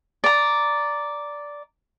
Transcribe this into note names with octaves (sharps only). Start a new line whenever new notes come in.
D5 A#5